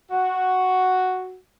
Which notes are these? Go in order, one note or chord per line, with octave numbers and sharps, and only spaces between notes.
F#4